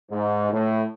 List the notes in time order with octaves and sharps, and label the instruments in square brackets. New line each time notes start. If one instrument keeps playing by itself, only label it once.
[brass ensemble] G#2
A2